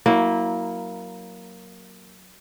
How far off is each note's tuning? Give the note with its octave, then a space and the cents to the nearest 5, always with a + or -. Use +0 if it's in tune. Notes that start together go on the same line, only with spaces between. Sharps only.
F#3 +0 A#3 +0 E4 -20